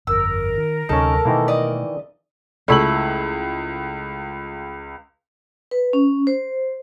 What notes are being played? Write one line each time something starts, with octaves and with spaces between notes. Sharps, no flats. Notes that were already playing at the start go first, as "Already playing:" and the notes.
G1 F2 A#4 E6
D#3
D2 C3 F#3 C#4 D#4 A4
B2 D#3 E3 A3 A#3
D5 D#5
C#2 A3 E4 F#7
B4
C#4
C5